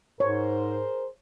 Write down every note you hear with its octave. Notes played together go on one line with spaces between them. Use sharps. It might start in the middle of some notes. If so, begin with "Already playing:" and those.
G#2 G#4 A#4 C5 C#5